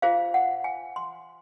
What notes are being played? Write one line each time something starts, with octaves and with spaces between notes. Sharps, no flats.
F4 G#4 C5 F5
F#5
G#5
C6